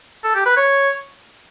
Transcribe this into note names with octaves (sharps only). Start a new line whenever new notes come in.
A4
G4
B4
C#5